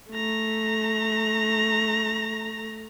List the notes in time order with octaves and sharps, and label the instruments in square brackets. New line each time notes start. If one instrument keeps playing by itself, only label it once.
[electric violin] A3 A#5